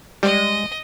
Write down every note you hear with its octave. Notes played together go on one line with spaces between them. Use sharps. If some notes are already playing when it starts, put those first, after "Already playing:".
G3 G#3 D#5